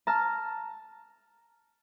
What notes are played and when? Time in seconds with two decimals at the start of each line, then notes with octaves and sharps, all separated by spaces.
0.07 A5 A#5 F6